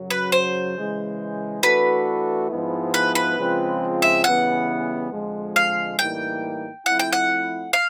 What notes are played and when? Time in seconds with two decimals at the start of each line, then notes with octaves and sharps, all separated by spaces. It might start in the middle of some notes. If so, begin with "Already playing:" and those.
Already playing: F#2 C#3 F#3
0.10 B4
0.32 C5
0.76 C#3 E3 G#3
1.63 E3 A3 D4 F#4 A4 B4
2.49 G#2 F3 G#3 B3 E4
2.94 B4
3.15 B4
3.38 C#3 F3 G#3 C4 F4
4.02 E5
4.24 C#3 E3 G3 B3 E4 F#5
5.11 F2 D3 F3 G#3
5.56 F5
5.98 A2 E3 G3 A#3 D#4 G5
6.86 F3 A3 C4 E4 F#5
6.99 G5
7.13 F#5
7.73 F5